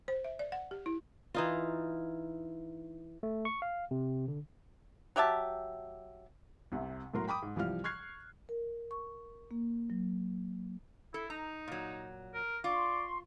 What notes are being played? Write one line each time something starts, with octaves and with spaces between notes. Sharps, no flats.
C5
E5
D5
F#5
G4
E4
E3 D#4 F4
A3
C#6
F5
C3
D3
F#3 G4 E5 A5
C2 C3
A2 F#3 A#4 C6
G5 B5 D6 D#6
G#2
C2 E3 F3 G3 F5 F6
C#6 F6 F#6 G#6 C7
A#4
C#6
A#3
F#3
E4 A4
D#4 A#5
A#2 F#3
A#4
F4 D5 C6 C#6